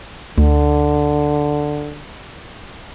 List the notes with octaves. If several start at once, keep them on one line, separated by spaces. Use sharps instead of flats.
D2 D3